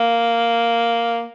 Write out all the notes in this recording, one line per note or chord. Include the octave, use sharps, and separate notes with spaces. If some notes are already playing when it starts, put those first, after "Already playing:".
Already playing: A#3